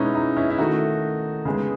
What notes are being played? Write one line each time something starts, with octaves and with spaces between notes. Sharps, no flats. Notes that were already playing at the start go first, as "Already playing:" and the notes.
Already playing: B2 G#3 B3 C#4 D#4 E4
D#4
C#4 E4
E4
D#3 A3 D#4 F#4
C#3 G#3 B3